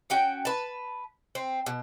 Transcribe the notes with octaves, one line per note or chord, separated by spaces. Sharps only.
C#4 F#4 G5
B4 A5
C4
B2